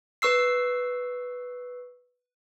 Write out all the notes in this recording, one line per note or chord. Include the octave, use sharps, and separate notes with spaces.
B4 C#6 E6 C7